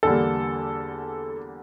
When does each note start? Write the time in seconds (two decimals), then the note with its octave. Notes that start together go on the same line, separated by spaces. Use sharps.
0.03 E2 D3 G3 A#3 A4